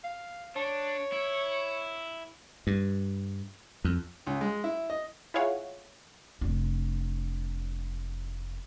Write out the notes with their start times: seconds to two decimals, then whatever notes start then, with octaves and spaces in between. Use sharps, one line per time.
0.04 F5
0.56 D4 C#5
1.12 E4
2.67 G2
3.85 F2
4.27 C#2
4.41 G#3
4.64 E4
4.90 D#5
5.34 E4 F4 G#4 C#5 F5 F#5
6.41 F1 D4